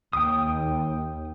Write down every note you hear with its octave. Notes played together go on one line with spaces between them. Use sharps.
D#2 G5 D#6